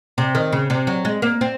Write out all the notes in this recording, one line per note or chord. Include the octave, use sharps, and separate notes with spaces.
C3
D#3
C#3
C3
F#3
G#3
A#3
C4